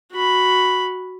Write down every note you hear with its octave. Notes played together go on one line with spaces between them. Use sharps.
F#4 B5